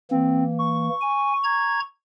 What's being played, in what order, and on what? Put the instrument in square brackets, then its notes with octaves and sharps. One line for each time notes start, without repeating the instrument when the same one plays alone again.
[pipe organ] E3 A#3 [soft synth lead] C4
[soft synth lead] C#6
[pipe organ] G#5
A#5 G#6